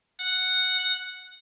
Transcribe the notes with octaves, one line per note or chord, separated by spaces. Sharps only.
F#5